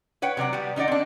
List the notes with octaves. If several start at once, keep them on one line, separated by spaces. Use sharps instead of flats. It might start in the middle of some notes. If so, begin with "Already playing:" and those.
B4 C#5 F#5 G5
C3 F#3 D5 F#5
G3 B3
D#3 D#4 F#4 D5 F#5
C4 D4